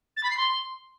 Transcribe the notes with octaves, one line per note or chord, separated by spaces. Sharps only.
A6
B5
C7
C6